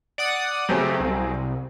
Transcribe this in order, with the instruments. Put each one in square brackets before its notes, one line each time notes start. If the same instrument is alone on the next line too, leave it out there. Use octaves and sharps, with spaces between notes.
[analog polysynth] D5 F#5 D#6
[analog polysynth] C#3 A3 G4 [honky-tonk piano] F#3 C4 G#4
[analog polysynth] C2